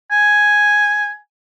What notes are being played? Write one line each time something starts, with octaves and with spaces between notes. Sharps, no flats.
G#5